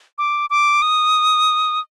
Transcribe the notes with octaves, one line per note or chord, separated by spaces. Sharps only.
D6
D6
D#6